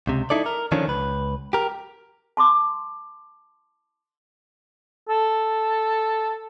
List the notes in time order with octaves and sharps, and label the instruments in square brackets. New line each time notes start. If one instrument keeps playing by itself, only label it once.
[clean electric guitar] C#2 C3
D#4 E4 A4 D5
A#4
D3 D#3 F3 C#4 D4
C#2 B4
G4 A#4
[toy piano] A5 C6 D6
[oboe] A4